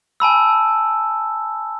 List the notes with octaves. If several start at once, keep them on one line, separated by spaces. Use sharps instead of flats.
G#5 A5 B5 E6